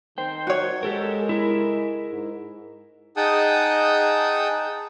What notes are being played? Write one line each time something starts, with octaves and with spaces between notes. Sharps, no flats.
D#3 C5 G5
F#4 C#5
G#3 G4 A4 A#4
E4 A#4
G#2
D#4 G#4 F#5 G5 A5 D#6